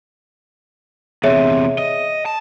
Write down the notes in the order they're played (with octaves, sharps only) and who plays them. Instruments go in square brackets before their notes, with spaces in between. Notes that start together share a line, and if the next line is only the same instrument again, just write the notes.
[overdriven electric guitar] E2 C3 [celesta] G#4 C#5 E5
[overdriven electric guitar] D#5
A5